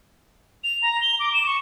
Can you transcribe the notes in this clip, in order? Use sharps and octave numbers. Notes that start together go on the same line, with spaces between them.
F7
A#5
G7
D6
E7
C#6